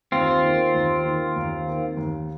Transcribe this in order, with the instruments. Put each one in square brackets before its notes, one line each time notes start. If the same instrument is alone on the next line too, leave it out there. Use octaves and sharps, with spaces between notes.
[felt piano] D#2 [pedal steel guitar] C4 F4
[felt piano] D#3 A#3
D#2
D#3 A#3
D#2
D#3 A#3
D#2